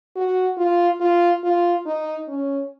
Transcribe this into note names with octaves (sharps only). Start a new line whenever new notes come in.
F#4
F4
F4
F4
D#4
C#4